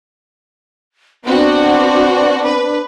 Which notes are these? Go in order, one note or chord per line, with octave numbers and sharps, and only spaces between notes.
B3 C4 D4 F#4
B4